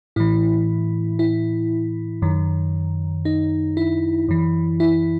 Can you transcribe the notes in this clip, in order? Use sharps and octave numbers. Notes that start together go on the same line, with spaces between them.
A2 E3 E4
E4
F#2 D#3
D#4
E4
F#2 E3
E4